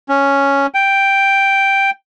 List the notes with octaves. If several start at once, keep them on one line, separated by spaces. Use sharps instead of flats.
C#4
G5